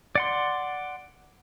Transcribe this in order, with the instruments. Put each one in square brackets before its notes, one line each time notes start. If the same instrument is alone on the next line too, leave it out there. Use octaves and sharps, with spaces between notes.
[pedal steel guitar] D5 F#5 C6